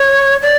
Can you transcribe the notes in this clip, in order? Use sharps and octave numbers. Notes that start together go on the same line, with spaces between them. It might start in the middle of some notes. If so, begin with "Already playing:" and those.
Already playing: C#5
D5